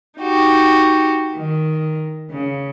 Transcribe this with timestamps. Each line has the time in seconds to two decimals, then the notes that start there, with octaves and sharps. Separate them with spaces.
0.19 D#4 F#4 G4
1.36 D#3
2.30 C#3